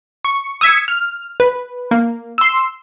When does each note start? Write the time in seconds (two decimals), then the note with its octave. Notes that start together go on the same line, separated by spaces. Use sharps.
0.25 C#6
0.61 D#6 E6 G#6 B6 C#7
0.88 F6
1.40 B4
1.91 A#3
2.38 C6 E6